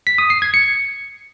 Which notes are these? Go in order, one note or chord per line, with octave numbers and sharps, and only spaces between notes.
B6
D#6
C7
G#6
C#7